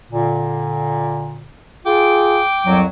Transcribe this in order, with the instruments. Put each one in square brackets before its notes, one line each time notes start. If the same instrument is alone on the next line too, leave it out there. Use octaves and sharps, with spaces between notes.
[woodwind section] A#2 D3
[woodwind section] F4 G#4 [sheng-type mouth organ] G5 D6
[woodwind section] C2 F2 F#3